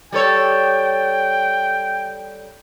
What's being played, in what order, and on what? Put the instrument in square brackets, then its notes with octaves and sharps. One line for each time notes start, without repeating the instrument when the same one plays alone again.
[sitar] G3 A4 C#5 [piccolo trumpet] G5